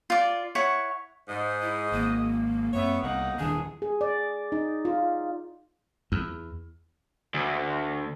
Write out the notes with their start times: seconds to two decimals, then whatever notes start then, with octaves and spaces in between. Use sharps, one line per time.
0.10 F4 D5
0.55 E4 C#5 F#5 C#6
1.29 G#2 D#5
1.62 E4
1.92 G#1 A#3
2.74 F#2 B3 C4 C#5 E5
3.03 C2 A#3 B3 D#4 F#5
3.39 D#1 D#3 E3 D4 G#4
3.82 G#4
4.01 D5
4.52 D#4
4.85 F4
6.12 E2
7.34 D2